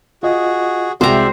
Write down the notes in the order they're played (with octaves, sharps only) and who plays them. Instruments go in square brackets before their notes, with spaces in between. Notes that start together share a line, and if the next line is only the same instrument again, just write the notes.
[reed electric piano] F4 D#5 [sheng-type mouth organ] F#4 G#4
[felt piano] C2 G#3 [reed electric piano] F#4 G5 [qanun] C5 A#5 [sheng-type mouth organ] D5 E5